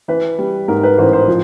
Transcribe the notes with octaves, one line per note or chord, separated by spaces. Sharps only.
E3 B4
G3
G#2 A#4
B4
A1 C5
C5
F3